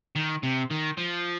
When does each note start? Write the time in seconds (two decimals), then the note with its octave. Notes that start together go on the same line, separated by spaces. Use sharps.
0.16 D#3
0.43 C3
0.71 D#3
0.97 F3